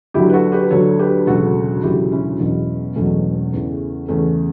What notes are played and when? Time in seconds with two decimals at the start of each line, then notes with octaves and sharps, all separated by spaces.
0.14 D2 D3 F#3 E4 G4
0.29 B4
0.33 F#4 A4
0.52 G4 B4
0.70 D2 D3 F#3 A4 C#5
0.99 G4 B4
1.27 E1 D2 C#3 F#3 F#4 A4
1.83 E1 D2 C#3 F#3 E4 G4
2.11 C#4 E4
2.40 E1 E2 B2 F#3
2.96 E1 E2 B2 F#3 A3 C#4
3.53 E2 C#3 E3
4.09 E2 C#3 E3 A3 C#4